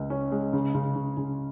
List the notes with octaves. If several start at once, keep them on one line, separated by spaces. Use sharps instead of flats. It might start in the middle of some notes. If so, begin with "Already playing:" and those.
Already playing: C#2 G#3
C#4
G#3
C#3
C#3
C#3
C#3